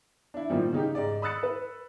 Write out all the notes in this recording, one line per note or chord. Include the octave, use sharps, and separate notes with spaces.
D4 E4
A#2 D#3 F3 G3
C#3 D#4 G4
G#2 D5
B5 D#6 E6 F#6 A6 C#7
B4